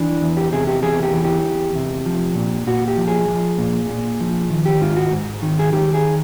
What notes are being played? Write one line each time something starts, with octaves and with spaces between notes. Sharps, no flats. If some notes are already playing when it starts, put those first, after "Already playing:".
Already playing: E3 D4
E2
G4
C3 G#4
G4
E2 G#4
G4
E3
G4
E2
C3
F3
A#2
A#2 F#4
G4
F3
G#4
F3
A#2
A#2
F3
D#3
G4
G#2 F4
F#4
G#2
D#3
G#4
D#3 G4
G#4